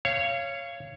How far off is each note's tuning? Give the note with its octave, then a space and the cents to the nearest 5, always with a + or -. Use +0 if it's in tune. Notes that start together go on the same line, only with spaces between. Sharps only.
C#5 +0 F5 -25